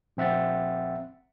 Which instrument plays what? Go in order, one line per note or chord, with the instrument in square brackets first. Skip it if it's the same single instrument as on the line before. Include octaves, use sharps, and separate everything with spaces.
[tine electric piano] A#1 C4 E5 F#5 A6